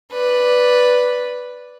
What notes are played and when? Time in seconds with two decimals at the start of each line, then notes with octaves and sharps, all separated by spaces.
0.12 B4 D5